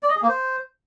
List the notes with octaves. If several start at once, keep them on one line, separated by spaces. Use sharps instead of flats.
D5
D#5
G#4
A#3
C5